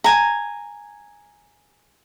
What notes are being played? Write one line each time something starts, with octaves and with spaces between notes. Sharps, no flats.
G#5 A#5